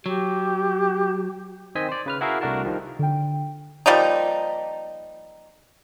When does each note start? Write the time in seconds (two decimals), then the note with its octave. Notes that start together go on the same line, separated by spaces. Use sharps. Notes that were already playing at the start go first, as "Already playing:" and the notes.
0.06 F#3 G4
1.75 D#3 C4 D#5 G#5 G6 B6
1.89 C5 D5
2.06 C#3 B4 F6
2.21 E4 F#4 G#4 A#4 E5 F5
2.41 C2 A3 D4 F#4 A#4 A5
2.64 D#3 F3 G3
2.99 D3 G5
3.86 F3 G3 A#3 D#4